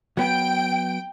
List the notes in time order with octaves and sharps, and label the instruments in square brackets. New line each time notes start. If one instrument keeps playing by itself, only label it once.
[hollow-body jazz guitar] F#3 B3 B4 [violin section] G5 D7